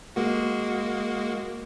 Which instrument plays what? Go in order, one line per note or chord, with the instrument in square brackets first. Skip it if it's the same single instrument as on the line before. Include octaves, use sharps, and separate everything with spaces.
[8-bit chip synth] G#3 A#3 F#4